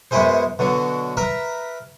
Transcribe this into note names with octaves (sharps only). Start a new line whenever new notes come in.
F#2 G#3 B3 E4 G#4 C5
B2 D3 F#3
A#4 B4 E5 A#5